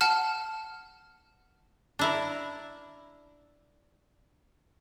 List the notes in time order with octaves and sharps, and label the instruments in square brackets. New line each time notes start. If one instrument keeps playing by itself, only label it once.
[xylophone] F#5 A5 F6
[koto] D4 E4 A#4